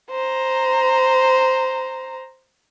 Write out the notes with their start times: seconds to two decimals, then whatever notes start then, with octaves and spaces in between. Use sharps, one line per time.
0.11 C5 A#5